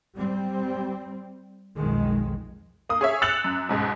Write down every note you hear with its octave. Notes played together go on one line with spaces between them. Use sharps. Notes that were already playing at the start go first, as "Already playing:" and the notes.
G3 C4
B1 F2 D#3 G#3
A#3 D#6
G#4 C#5 E5
E6 F#6 A6 C#7 F7 F#7
F#2
C#2 G#2 B2